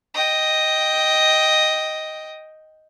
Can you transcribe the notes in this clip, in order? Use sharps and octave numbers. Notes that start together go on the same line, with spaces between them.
D#5 G5